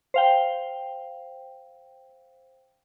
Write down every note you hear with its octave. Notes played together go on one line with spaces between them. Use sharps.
C5 F5 G5